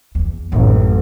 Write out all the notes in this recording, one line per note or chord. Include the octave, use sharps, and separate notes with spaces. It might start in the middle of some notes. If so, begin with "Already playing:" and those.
E2
A1 F#2 A2